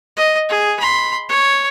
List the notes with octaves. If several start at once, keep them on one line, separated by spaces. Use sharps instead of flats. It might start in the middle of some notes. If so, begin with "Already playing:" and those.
D#5
G#4
B5 C6
C#5